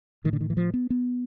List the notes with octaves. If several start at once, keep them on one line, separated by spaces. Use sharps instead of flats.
A2 D#3
D3
D#3
E3
F3
B3
B3